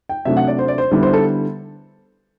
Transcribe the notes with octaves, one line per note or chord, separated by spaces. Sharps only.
G5
C3 F#3 A3 D4 E5
F#5
D5
C5
D5
C5
D3 G3 B3 E4
C5
A4